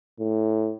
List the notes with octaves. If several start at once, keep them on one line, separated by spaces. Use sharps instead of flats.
A2